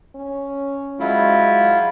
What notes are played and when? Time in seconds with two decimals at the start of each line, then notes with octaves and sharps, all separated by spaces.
0.15 C#4
1.00 F#3 G#3 E4 F4